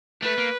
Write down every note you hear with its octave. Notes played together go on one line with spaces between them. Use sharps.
A3 B4
A#3